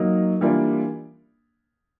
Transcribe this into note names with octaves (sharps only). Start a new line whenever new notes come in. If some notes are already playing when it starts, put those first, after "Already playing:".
Already playing: F#3 A#3 D#4
E3 G3 A#3 D4 F4